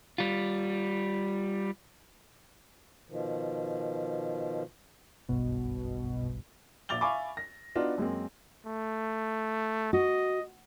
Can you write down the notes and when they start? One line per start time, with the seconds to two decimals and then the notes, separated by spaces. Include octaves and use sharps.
0.18 G3 F4
3.08 B2 D#3 F3
5.29 F#1 B1 G2 B2
6.89 A#1 E5 D6 A6 F7 G7
7.01 E5 F5 G#5 B5 C#6 D6
7.37 A#6
7.75 B3 D4 D#4 F4 F#4
7.98 F#2 G#3 A#3 C4
8.66 A3
9.93 F#4 D#5